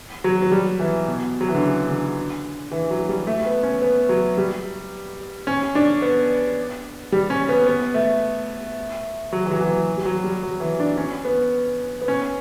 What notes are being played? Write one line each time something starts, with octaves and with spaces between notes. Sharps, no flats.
F#3
F#3
G3
E3
B2
F#3
E3
D3
C#3
D3
E3
F#3
G3
A3
B3
C#4
B3
F#3
G3
C#4
D4
B3
G3
C#4
B3
B3
A3
F#3
E3
F#3
E3
F#3
G3
F#3
G3
F#3
E3
D4
C#4
B3
B3
C#4